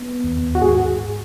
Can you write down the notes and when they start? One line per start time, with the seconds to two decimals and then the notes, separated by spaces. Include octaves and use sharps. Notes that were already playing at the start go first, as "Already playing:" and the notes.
Already playing: B3
0.24 D#2
0.55 F#4
0.61 G#2 G#4